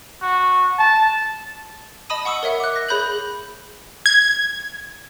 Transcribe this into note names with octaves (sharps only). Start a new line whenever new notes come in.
F#4
A5
D#5 A5 B5 D#6 D#7
F#5 C#6 D#6 E6 C#7
A#4 C#5 E5 F#5
D6 F#6
A#6
G#4 C#5 B5 F#6 G6 F#7
G#6